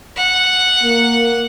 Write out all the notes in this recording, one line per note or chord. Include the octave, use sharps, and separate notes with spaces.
F#5
A#3